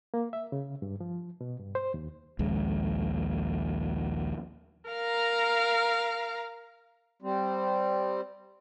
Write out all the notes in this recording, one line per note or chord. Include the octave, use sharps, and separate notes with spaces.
A#3
E5
C#3
G2
F3
B2
G2
C5
D#2
A#1 D#2 G#3
A#4 F5 A#5
G3 C4